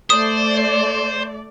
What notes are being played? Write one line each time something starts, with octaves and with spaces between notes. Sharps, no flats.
A3 C5 D5 D#6